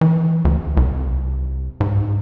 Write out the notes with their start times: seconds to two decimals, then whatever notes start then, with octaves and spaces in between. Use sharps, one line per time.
0.01 E3
0.45 D2
0.77 C2
1.80 G#2